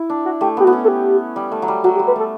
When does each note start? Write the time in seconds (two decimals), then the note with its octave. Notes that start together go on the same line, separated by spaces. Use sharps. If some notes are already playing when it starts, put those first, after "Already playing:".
Already playing: E4
0.10 D4
0.25 F#4
0.41 A3 G4
0.57 B3 G4
0.65 F#4
0.67 B3
0.73 C#4
0.84 A4
0.88 G4
1.36 G3
1.52 A3
1.62 F#3
1.68 G3
1.84 F#3 F#4
1.96 G4
1.99 G3
2.07 B4
2.16 A3 A4